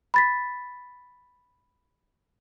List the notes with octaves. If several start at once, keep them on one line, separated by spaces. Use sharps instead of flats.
B5 A6 B6